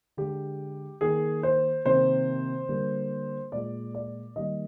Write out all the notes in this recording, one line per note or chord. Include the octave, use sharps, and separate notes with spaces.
D3 G#3 G4
D#3 A#3 G#4
C5
C3 D#3 A#3 C5
D3 G3 A#3
A#2 G#3 D5
D5
D#3 G3 A#3 D#5